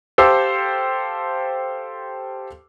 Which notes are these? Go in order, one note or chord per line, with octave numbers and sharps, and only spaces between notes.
G4 A4 C5 F5 D6 E6